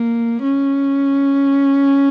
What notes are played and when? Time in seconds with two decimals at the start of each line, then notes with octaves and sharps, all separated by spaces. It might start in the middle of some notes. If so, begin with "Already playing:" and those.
Already playing: A#3
0.43 C#4